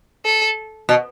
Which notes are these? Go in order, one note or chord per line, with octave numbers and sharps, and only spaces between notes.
A4
B2